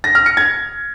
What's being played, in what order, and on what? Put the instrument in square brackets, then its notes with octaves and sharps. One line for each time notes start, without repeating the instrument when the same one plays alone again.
[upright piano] A#6
F6
C#7
G#6